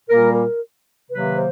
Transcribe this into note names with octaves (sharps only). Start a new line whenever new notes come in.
A#2 G3 A#3 A#4
A#4
C3 D#3 F#3 A#3 B4
C5